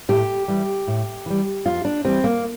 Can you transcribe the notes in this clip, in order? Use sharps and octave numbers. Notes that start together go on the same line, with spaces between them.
A2 G4
E3 G3
A2
E3 G3
F2 F4
D4
E3 G3 C4
A#3